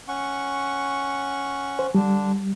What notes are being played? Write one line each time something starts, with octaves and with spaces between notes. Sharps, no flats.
C#4 F#5 C#6
C5
D3 G3 D4